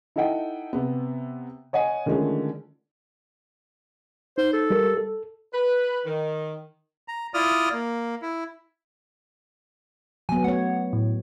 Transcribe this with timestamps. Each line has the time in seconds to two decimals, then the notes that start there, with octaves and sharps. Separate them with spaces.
0.16 D#4 E4 A4 D#5 F#5 G5
0.73 C3 B3
1.73 C#5 D#5 F#5 G#5
2.06 D3 D#3 F3 G#3 A3 C#4
4.38 D#4 C5
4.53 A4
4.70 G3 G4 A#4
4.97 A4
5.53 B4
6.06 D#3
7.08 A#5
7.34 E4 F4 D5 D#6 F6
7.73 A#3
8.22 E4
10.29 F#3 B3 G#5
10.44 A3 C#5 F#5
10.93 A2